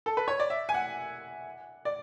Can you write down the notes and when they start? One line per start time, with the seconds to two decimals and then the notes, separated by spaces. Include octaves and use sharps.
0.06 A4
0.17 B4
0.28 C#5
0.40 D5
0.50 E5
0.69 G#5
0.74 F#5
1.85 D5